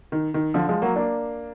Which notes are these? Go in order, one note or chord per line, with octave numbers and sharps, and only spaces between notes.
D#3
D#3
D3 F3
F3 G#3
F#3 A#3
A#3 D4